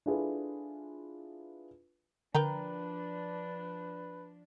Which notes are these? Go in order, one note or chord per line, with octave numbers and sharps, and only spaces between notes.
D4 E4 F4 G#4 A4 B4
D3 F3 D4 A#4 B4 G5 A#5